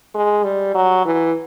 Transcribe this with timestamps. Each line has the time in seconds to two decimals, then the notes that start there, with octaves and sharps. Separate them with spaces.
0.14 G#3
0.44 G3
0.75 F#3
1.05 E3